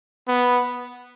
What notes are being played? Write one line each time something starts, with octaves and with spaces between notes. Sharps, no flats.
B3